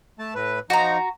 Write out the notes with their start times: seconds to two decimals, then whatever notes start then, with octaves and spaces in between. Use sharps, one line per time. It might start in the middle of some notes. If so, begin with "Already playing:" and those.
0.19 A3 A5
0.35 A2 B4
0.70 F3 D#4 F#4 A#5